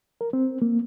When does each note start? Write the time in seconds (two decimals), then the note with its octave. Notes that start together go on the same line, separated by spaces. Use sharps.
0.21 A#4
0.33 C4
0.62 A#3